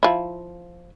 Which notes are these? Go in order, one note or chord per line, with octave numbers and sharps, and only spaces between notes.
F3 E4